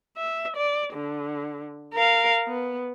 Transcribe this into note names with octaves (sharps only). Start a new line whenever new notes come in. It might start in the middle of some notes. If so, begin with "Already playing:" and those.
E5
D5
D3
A#4 F5
B3